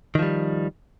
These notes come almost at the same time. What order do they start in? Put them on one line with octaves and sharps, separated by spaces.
D#3 F3 G3